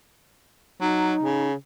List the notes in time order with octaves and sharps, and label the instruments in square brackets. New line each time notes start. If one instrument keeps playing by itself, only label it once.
[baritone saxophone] F#3 [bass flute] D#4
[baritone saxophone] C#3